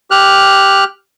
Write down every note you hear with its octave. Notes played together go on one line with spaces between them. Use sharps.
G4 F6 F#6